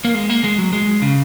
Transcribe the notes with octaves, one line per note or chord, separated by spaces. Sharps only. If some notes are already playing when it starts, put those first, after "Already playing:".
A#3
G#3
A#3
G#3
F#3
G#3
C#3